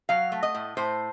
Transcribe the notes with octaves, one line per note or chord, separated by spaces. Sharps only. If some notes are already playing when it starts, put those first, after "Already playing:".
F#3 F5
A3
D#5
A2
A2 C5